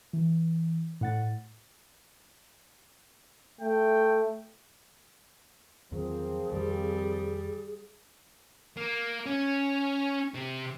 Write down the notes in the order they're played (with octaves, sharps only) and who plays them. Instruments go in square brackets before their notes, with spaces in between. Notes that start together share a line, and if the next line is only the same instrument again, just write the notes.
[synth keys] E3
A2 F#5 A6
[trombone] A3 [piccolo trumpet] G5
[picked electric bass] E2 D#3 F#3 [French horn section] F3 A#3 C4 [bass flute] G#4
[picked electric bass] F2 D#3 [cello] G3
[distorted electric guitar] A#3
C#4
C3